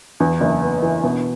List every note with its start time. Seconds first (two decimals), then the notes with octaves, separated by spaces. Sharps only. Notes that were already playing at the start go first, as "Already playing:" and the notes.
0.20 E2
0.41 F#1
0.62 B3
0.82 E3
1.04 B2